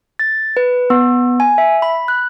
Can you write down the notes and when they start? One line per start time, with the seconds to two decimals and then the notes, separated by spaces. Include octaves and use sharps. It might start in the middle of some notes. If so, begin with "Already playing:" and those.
0.19 A6
0.57 B4
0.90 B3
1.40 G#5
1.58 E5
1.82 B5
2.08 F#6